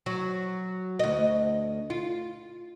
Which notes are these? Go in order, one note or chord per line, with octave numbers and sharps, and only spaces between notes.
F#3
D2 D#5
F4